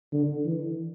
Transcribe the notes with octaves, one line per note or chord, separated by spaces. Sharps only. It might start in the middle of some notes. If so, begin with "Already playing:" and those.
D3
E3